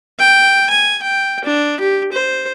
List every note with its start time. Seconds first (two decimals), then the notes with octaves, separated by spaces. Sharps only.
0.19 G5
0.70 G#5
1.03 G5
1.44 D4
1.80 G4
2.12 C5